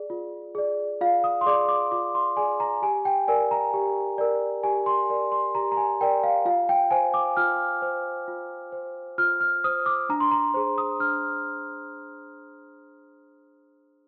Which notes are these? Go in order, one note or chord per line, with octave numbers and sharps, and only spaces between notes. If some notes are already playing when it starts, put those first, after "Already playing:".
Already playing: G#4 D5
F4
G#4 D5
F4 F5
D#6
C6
G#4 D5 D6
D6
F4 D6
C6
G#4 D5 G#5
A#5
G4 G#5
G5
A#4 D5 G#5
A#5
G4
A#4 D5
G4 G#5
C6
A#4 D5
C6
G4 A#5
A#5
G#5
A#4 D5 G5
F5
F4 F5
G5
C5 G#5
D6
F4 F6
C5
F4
C5
F4 F6
F6
C5 D#6
D6
D4 A#5
C6
A#5
G#4 C5
D#6
D4 F6